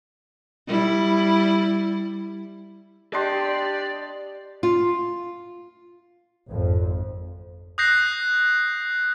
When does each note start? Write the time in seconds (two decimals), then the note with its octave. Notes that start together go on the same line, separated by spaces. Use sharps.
0.67 G3 E4
3.14 D4 G4 D5 D#5 C6
4.63 F4
6.48 G#1 F2
7.78 D#6 F#6 G6 A#6 C7